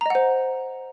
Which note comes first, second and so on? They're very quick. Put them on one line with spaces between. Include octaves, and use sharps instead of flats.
A#5 D#5 F#5 C5